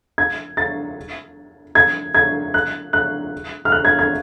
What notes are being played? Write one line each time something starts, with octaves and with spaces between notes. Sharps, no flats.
G#6
A6
G#6
G#6
F#6
F#6
F6
F#6
G#6
G#6